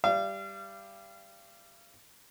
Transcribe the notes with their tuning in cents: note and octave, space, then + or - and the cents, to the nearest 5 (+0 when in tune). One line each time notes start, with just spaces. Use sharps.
G3 +0 F5 -35